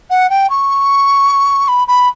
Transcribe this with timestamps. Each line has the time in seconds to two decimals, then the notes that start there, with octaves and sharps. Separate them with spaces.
0.10 F#5
0.30 G5
0.50 C#6
1.68 B5
1.88 B5